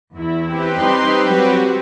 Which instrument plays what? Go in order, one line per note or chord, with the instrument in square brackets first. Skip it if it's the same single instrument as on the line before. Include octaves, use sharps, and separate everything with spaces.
[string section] E2 E4
[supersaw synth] C4 G4 B4
[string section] G3 D#4 C6
F#3 G3 F#4